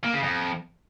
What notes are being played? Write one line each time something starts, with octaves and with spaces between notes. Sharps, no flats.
A#3
C#3
F2